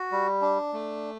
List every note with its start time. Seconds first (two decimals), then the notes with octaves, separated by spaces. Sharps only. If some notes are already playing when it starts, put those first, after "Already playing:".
Already playing: F#4
0.12 G3
0.42 D4
0.73 A3